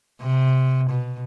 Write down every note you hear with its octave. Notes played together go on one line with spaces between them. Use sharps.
C3
B2